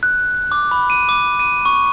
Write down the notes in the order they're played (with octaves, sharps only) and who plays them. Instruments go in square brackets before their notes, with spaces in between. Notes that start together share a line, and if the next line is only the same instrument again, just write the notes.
[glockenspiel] F#6
D6
B5
D#7
D6
D#7
C#6